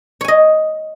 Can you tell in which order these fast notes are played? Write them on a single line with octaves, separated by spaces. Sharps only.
C#5 G#5 D#5